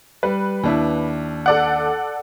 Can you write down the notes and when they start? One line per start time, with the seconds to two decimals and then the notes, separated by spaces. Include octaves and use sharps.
0.23 G3 B4
0.63 D#2 D4 E4
1.46 A4 D5 F#5